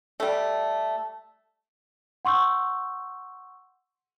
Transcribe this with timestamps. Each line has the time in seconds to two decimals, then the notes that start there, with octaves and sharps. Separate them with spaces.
0.20 G3 A3
2.25 F#5 C6 C#6 E6 G6